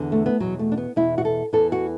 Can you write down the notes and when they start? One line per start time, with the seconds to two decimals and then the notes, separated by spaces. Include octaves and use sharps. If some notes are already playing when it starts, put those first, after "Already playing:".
Already playing: E2 D3
0.12 A3
0.26 B3
0.40 E2 B2 F#3
0.59 A3
0.72 D4
0.78 B3
0.96 E2 B2 E4
1.18 F#4
1.25 A4
1.53 E2 E3 A4
1.72 F#4